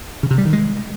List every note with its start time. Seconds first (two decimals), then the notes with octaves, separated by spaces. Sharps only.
0.23 C#3
0.31 C3
0.38 G3
0.45 D#3
0.53 G#3